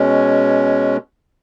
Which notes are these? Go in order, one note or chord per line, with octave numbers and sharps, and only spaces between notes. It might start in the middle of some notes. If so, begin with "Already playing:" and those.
Already playing: B2 G#3 C#4